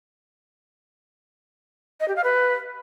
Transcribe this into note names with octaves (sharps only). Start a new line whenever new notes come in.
D#5
G4
F5
B4